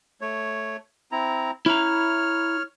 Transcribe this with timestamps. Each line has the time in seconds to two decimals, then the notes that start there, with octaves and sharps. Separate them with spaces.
0.21 A3 C#5
1.12 C4 E4 A#5
1.66 E4 C#5 A#5 F6